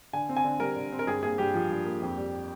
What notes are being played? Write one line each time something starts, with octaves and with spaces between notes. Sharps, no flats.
D3 G#5
C4
G#5
D3
G3 A#4
D3
C4
A#4
G2 G#4
A#3 G#4
G2 G4
F3
G2
A#3
F2
G3